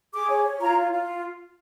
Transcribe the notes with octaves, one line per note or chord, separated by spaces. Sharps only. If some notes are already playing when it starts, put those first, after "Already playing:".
G#4 D6
C#5
C#5
F4 A#5
F4
F4